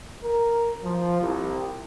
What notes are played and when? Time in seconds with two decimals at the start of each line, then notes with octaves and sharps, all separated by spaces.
0.24 A#4
0.84 F3
1.21 C2